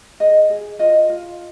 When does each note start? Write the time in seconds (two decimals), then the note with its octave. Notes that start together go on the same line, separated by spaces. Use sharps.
0.20 G#4 D#5
0.50 G#4
0.79 F4 D#5
1.10 F4